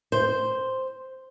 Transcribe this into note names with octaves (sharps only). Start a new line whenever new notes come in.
C5